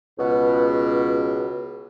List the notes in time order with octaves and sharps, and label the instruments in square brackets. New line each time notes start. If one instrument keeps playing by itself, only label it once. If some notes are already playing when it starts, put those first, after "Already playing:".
[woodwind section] C#2 B2